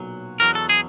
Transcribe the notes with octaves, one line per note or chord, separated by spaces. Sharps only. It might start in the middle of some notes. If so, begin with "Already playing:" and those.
Already playing: B1 A#2 F#3
E2 B2 F#3 A#4
A4
G#4